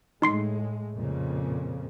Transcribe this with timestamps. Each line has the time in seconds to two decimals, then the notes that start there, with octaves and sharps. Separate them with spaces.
0.22 A2 G#3 D#4 C6 C7
0.95 F2 A#2 C#3